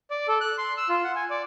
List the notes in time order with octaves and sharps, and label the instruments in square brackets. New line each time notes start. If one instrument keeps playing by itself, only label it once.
[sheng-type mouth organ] D5
A4
F#6
C6
E6
F4
F#5
G#5
D5